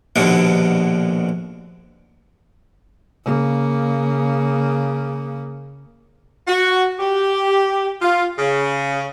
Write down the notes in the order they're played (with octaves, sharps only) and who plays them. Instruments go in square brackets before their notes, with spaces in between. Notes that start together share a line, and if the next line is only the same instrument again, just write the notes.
[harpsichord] A#1 D#2 B2 D3
[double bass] C#3 A#3
[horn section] F#4
G4
F4
C#3